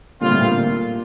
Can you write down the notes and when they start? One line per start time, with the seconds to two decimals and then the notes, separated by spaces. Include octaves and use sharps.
0.21 A#2 D3 G3 C4 F4
0.31 A2
0.41 A#2